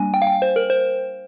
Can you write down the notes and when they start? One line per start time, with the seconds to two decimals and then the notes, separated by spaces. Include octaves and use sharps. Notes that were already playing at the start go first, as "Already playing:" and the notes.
Already playing: G3 A#3 D4 G#5
0.14 G5
0.22 F5
0.27 G5
0.42 C5
0.56 A#4
0.70 C5